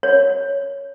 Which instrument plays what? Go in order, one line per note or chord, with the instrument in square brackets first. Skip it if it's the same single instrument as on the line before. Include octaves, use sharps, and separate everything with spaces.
[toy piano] C#5